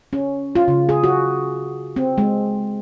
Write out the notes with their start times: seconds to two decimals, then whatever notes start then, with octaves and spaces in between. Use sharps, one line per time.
0.13 C#4
0.55 F4
0.68 C#3
0.89 G#4
1.04 F#4
1.96 C4
2.18 G#3